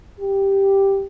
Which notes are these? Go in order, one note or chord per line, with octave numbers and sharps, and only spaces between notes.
G4